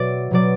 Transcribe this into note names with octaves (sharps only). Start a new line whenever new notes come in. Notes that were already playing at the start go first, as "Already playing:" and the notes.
Already playing: B2 F#3 D5 E5
B2 F#3 D5